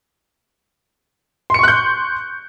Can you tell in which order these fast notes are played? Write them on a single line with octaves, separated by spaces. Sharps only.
C6 C#7 C#6 F#6 G6